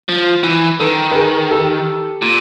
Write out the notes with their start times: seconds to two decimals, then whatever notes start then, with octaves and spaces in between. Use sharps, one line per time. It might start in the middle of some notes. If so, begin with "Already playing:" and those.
0.09 F3
0.43 E3
0.80 D#3 A4 B4
1.11 B4
1.15 G#4 A#4
1.51 G4 A4
2.22 A#2